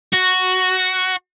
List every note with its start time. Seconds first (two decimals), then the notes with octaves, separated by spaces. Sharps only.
0.13 F#4